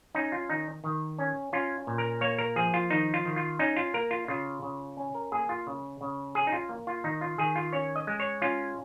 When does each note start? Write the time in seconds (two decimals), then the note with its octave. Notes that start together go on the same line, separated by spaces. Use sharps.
0.15 C#4 D#4
0.32 F4
0.50 D#3 D#4
0.84 D#3
1.19 C#4
1.53 C#4 F4
1.87 A#2
1.98 A#4
2.21 A#3 C#5
2.39 A#4
2.56 F3 G#4
2.74 F4
2.91 D#3 D#4
3.14 F4
3.25 D#3
3.36 F4
3.59 C#4 D#4
3.77 F4
3.94 A#3 A#4
4.11 F4
4.28 C#3 F4
4.62 C#3
4.97 C#4
5.15 A#4
5.32 A#3 G#4
5.49 F4
5.67 C#3
6.01 C#3
6.35 C#4 G#4
6.47 D#4
6.53 F4
6.69 A#3
6.87 F4
7.04 D#3 D#4
7.21 F4
7.38 D#3 G#4
7.56 F4
7.73 C#4 C#5
7.96 D#5
8.07 G#3
8.20 C#5
8.42 C#4 F4